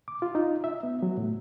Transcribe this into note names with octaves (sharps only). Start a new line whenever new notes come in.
D6
F4
D#4
E5
B3
F#3
A2